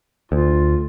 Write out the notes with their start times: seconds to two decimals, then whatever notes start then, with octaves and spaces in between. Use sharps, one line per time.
0.32 D2 F4